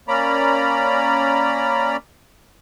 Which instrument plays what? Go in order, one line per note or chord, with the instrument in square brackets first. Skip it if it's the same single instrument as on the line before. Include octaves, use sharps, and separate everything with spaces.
[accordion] A#3 C#4 D5 A#5 B5